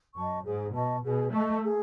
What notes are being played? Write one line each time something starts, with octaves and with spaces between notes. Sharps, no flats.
F#2 D#5 A5 C#6
G#2 G#4
B2 D#5 A5 C#6
B2 G#4
A3 D#5 A5 C#6
G#4